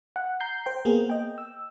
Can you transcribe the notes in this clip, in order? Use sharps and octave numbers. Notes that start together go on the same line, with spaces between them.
F#5
A#5 G6 C7
C5 G5
A#3 B3 G#4 A#4
D#5 G5
E6